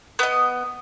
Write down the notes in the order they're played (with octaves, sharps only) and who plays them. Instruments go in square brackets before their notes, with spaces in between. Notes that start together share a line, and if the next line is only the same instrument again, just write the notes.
[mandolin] B3 D#5